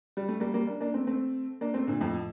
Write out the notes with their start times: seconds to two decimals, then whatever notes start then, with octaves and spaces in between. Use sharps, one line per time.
0.17 G3
0.29 A3
0.40 G3 A#3
0.54 G3 A#3
0.67 A#3 D4
0.81 A#3 D4
0.94 A3 C4
1.07 A3 C4
1.61 A#3 D4
1.74 A3 C4
1.87 A#2 D3
2.01 F2 A2